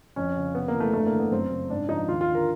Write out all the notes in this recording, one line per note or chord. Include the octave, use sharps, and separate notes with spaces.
F2 C#4
C#3
C3 B3
A#3
E3
A3
G2 A3
A#3
E3
B3
F#2 C4
C#3
G#2 D4
F3 D#4
D#2 F4
F4
D3
A#4